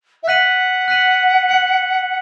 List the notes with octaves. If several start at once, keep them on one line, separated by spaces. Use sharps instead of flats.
E5
F#5 F#6 B6 D#7 F#7
F#6 B6 D#7 F#7
F#6 C#7 F#7